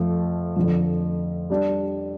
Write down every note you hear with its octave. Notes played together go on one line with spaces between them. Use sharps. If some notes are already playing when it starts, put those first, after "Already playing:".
Already playing: F2 F3 A3
F2 D3 F3
G3 D4 G4